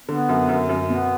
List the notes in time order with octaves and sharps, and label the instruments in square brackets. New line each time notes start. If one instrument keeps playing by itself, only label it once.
[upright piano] D3 [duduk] B3
[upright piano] F#2
F#2
F#2
[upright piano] B2 [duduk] B3